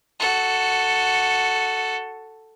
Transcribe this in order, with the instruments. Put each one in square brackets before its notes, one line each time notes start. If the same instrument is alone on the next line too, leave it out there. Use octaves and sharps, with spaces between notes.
[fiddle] F#4 A4